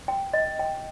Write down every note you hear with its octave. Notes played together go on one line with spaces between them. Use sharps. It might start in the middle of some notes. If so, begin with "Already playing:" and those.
G5
D#5
G5